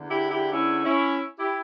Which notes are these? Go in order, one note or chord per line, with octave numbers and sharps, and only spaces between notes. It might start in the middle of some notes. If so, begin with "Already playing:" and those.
Already playing: E2 D3
E4 G4
E4 G4
C#4 E4
C#4 E4
E4 G4